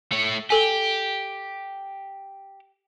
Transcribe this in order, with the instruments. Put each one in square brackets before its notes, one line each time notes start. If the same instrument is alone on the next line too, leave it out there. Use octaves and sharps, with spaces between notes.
[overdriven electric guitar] A3 C#5
[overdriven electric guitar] G4 [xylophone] A4 G#5